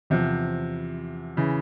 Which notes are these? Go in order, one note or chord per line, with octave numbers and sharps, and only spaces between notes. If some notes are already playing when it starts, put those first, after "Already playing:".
E2 C3 F3
C#3 E3